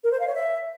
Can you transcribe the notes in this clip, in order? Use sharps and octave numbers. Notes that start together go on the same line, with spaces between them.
A#4
C5
F5
C#5
E5